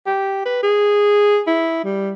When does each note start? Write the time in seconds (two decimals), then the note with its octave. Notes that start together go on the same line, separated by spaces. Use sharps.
0.06 G4
0.45 B4
0.63 G#4
1.47 E4
1.85 G3